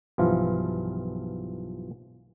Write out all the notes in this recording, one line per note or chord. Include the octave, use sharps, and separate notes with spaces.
B1 G2 E3 F3 F4